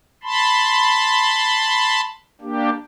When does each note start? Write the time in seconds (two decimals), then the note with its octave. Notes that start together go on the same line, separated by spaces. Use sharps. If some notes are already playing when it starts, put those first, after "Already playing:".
0.23 A5 B5 C6
2.41 A#3 D4 G4